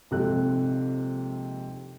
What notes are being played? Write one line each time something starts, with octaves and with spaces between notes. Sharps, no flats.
A#1 G#2 C3 A4 F#6